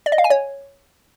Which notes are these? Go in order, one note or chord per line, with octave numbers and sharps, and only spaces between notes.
D5
D#5
F5
G#5
C#5